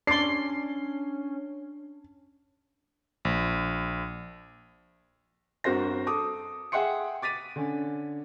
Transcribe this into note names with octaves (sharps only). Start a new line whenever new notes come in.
C#4 D4 D5 C6 C7
A#1
G1 C4 F#4 A#4 C5 A#6
A4 D6 D#6
G#4 E5 F#5 G5 C6 C#7
D6 A6 B6 D#7
D3 C#4